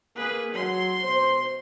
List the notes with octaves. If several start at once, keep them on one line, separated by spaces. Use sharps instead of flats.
A#3 G#4 B4
F#3 C6
B2 C5